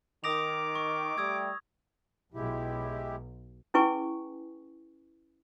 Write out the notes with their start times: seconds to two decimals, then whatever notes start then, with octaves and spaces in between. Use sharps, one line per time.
0.24 D#3 D6 D#6 A#6 F7
0.75 C#6
1.18 G3 A3 G4 D#6 E6 G#6
2.34 B1 G#3 E4 G4
3.74 C#4 E4 G#4 B4 G#5 C#6